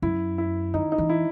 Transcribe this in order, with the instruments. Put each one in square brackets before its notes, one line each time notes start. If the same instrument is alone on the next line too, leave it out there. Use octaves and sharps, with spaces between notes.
[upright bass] F#2 [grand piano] E4
[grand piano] E4
[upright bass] D#3 [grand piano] D#4
[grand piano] D#4
[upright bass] E3
[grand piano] E4